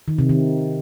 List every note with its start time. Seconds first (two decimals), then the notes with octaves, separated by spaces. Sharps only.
0.08 D#3
0.18 C3
0.29 D#3